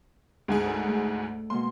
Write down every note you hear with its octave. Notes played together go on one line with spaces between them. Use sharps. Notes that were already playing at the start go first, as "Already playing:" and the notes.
D2 G#2 G#4
D4 A4 A#4
A3
B2 G#3 A#3 C6